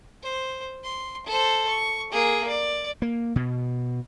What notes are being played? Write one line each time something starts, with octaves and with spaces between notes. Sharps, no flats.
C5
C6
A4 C5
C#6
A#3 G#4
D5
A#3
B2